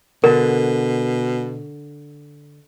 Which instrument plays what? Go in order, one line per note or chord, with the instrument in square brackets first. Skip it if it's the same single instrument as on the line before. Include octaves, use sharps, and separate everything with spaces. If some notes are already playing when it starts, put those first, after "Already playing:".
[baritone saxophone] B2 [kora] D3 [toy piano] A#4